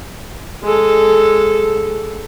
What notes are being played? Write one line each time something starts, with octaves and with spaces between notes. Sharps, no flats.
G#3 A4